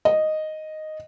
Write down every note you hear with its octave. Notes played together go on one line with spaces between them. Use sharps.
D#5